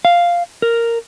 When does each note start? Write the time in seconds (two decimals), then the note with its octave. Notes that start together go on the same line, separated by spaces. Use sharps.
0.05 F5
0.62 A#4